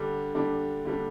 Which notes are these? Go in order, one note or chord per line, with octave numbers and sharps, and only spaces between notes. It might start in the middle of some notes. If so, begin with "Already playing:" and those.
Already playing: D3 G3 D4
D3 G3 D4
D3 G3 D4